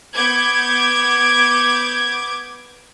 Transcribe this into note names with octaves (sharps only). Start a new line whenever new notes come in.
B3 D6 G6 G#6